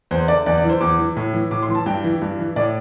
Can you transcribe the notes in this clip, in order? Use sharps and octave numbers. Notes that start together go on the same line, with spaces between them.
E2 C5
D3 D5
E2 D5
D5
E3
C5
E2 D6
E3
A2
E3
A2 D6
C6
E3
A5
G2 G5
E3
G2
E3
A2 D5